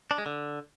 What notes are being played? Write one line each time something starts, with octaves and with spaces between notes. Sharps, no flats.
D4
G#3
D3